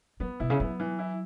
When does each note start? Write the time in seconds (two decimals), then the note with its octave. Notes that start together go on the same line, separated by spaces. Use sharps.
0.20 F#3 B3
0.40 B2 E4
0.50 C#3
0.60 F#3 B3
0.80 E3
0.99 E4